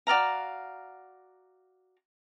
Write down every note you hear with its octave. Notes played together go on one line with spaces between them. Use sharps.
F#4 D5 F5 A#5